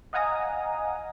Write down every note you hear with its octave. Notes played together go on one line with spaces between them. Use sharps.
D#5 F5 F#5 G#5 A#5 D#6